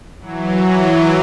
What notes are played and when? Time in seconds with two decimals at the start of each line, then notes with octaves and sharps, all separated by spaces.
0.20 E3 F#3